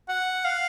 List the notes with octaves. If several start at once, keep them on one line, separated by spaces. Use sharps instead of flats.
F#5
F5